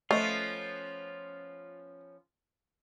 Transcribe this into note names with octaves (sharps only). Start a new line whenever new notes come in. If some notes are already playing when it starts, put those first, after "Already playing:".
F3 A3 B3 C#4 F4 D#5